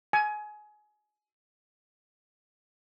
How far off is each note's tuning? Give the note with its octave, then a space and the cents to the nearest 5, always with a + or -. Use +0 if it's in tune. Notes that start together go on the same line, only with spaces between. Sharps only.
G#5 +25